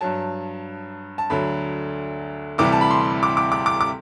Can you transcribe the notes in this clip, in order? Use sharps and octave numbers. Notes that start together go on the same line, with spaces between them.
G2 F#3 A5
A5
D2 D3 F#3 B5
D2 C3 E3 G3 D6
A5
B5
C6
D6
D6
D6
D6
D6